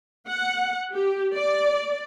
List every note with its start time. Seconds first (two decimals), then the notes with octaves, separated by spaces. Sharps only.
0.28 F#5
0.94 G4
1.34 D5